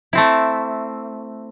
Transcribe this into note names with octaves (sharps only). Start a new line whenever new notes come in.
A3 C4 E4